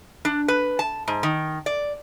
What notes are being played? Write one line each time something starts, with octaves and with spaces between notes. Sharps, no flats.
D4
B4
A5
G#2
D#3
D5